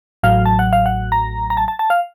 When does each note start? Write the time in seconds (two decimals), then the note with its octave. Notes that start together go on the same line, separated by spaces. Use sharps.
0.23 A1 A2 F#3 F5
0.46 A5
0.59 F#5
0.73 F5
0.86 F#5
1.12 A#5
1.50 A#5
1.57 A5
1.68 A5
1.79 A5
1.90 F5